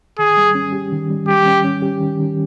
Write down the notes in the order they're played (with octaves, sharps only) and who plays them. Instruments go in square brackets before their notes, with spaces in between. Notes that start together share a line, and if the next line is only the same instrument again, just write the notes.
[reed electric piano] D#3 [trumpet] G#4
[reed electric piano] G3
C#4
G4
D#3
G3
[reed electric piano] G3 [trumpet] G4
[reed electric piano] C#4
C#4
G4
D#3
D#3